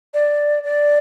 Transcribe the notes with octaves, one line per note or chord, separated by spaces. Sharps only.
D5
D5